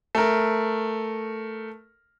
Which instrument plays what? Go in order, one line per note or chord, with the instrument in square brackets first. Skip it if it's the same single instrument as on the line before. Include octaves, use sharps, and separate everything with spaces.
[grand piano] A3 A#4